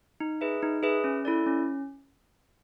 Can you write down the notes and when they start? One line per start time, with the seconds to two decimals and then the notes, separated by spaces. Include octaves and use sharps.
0.20 D#4
0.41 G#4 B4 E5
0.62 D#4
0.83 G#4 B4 E5
1.04 C#4
1.25 E4 A4 D5
1.46 C#4